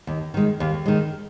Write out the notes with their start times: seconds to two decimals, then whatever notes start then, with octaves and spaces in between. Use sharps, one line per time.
0.07 D#2
0.34 D#3 G#3
0.60 D#2
0.86 D#3 G#3